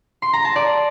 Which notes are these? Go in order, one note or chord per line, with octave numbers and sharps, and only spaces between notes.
C6
A#5
A5
D5